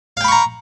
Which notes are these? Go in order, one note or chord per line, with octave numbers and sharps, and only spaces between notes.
F5 G5 A#5 B5 C#6